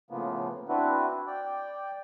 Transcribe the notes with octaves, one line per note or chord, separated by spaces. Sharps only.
A2 C#3 F3 A#3 B3
C4 D4 E4 F#4 B4
D5 G5